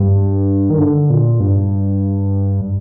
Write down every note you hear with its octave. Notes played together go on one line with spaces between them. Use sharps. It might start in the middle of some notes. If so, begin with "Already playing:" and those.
Already playing: G2
D#3
D3
A#2
G2